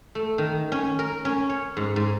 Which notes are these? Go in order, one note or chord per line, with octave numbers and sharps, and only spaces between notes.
A3
D#3
C#4
A#4
C#4
C#5
G#2
G#2